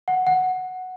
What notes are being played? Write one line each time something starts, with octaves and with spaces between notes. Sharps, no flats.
F#5
F#5